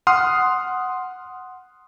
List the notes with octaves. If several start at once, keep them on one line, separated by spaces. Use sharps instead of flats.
F#5 C6 D#6 F6